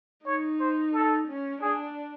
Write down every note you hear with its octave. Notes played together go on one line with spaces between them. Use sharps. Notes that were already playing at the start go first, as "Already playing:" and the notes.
D#4 C#5
C5
A4
C#4
D4 G#4